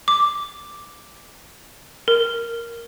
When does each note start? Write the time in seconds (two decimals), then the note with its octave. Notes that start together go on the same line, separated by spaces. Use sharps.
0.08 D6
2.08 A#4